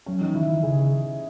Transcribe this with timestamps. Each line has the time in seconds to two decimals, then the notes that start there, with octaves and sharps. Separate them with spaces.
0.06 F#3 C#4
0.21 E3 D#4
0.34 D#3 E4
0.48 D#3 E4
0.63 C#3 G#4